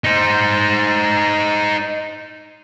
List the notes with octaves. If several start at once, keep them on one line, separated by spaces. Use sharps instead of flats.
D#4 C5